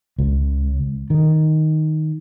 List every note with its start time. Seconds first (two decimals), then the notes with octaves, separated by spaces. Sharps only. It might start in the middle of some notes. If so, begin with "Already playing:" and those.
0.19 C#2
1.10 D#3